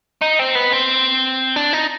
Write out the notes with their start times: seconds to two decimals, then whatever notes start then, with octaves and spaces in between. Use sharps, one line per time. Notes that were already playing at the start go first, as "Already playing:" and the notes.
0.21 D#4
0.39 C4
0.55 B3
0.73 C4
1.56 D4
1.73 D#4